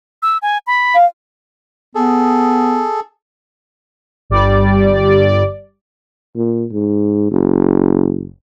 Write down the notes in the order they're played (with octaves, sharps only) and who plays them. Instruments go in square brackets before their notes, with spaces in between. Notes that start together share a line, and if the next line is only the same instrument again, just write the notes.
[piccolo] E6
G#5
B5
[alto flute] F5
[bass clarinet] B3 [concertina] G#4 A4
[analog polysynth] G1 G3 D5
[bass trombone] A#2
G#2
F#1